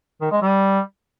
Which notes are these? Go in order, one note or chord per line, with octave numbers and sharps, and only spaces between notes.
D#3
G#3
G3